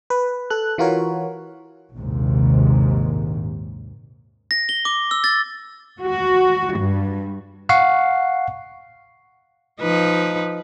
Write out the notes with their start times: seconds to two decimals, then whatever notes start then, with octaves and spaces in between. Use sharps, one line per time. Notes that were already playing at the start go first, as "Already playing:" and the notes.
0.10 B4
0.50 A4 F#6
0.78 E3 F4 F#4 A#4 C#5
1.96 A#1 D#2 G#2 C3
4.51 A#6
4.69 G7
4.85 D6
5.11 E6
5.24 A6
6.02 F#4
6.77 G2
7.69 F5 F#5 C#6 C7
9.81 F3 D#4 B4